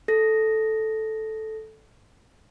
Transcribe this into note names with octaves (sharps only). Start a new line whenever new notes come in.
A4 A#6